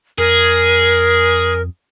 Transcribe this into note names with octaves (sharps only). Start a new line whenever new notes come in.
F2 G#4 A#4